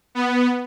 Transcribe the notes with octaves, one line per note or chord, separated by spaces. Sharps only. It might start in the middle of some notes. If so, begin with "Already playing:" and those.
B3